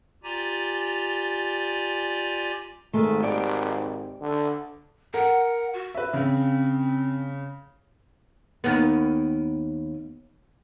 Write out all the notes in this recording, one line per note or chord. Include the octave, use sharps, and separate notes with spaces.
F4 G4 D5 G#5 A#5
G#1 D#3 G#3 A3
G4 C#5 D5
D3
A#4 F#5
F#4
B4 E5
C#3 C4
D#2 B3